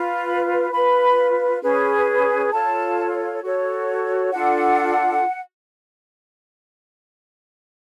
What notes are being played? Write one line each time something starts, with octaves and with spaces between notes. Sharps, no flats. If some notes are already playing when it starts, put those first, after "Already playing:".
Already playing: F4 B4
B5
F4 B4 B5
C#4 G#4 B4
F4 A4 C#5 A5
F#4 A4 C#5
D4 F4 A4 F#5